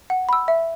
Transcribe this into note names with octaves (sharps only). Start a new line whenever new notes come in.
F#5
B5 E6
E5